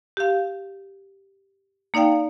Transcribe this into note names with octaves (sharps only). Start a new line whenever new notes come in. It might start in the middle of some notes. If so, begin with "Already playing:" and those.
G4 F5
A#3 D#4 D5 F5 G5